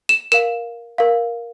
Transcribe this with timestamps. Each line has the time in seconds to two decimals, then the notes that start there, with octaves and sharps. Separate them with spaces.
0.09 E7
0.32 A#4 F5 E7
0.98 A#4 F5